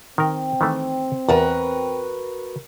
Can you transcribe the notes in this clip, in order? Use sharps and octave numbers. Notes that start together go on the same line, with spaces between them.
D#3 C4 A#4 G5
D#3 E3 A3
E2 F#4 A#4 B4 A5